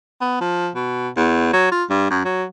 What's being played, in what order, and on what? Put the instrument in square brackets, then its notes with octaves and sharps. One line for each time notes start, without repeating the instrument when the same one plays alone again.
[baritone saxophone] B3
F3
B2
E2
F#3
F4
G2
F#2
F#3